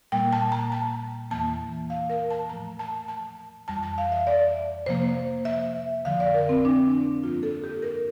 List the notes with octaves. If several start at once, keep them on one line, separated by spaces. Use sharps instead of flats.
A#2 G3 A#3 G5
A5
A#5
A5
E2 E3 A#3 A5
F5
A#4
A5
A2 F3 A3 A#5
A5
A5
F2 E3 G3 A5
A5
F5
E5
D5
C3 F3 A#3 C5
E5
F2 D3 F3 F5
D5
A#4
C4
D4
G2 F3 A#3 F4
A4
G4
A#4